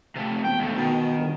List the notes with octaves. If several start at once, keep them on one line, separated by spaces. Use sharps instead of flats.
C3 A3
E1 G5
D#2 A3
B2 D#3
G1